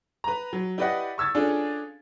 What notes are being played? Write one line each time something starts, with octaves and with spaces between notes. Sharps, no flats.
B4 A#5
F#3
E4 G4 B4 D5 D#5 F#5
C#6 E6 G#6 A6
C#4 D4 F4 G#4 A4 D5